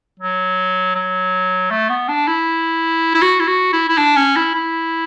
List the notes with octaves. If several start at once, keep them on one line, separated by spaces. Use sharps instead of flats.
F#3
F#3
A3
B3
D4
E4
E4
F#4
E4
F#4
E4
E4
D4
C#4
E4
E4